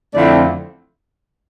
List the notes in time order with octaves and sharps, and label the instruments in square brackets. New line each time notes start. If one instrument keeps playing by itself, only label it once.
[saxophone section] F2 D3 A3 C4 E4 D5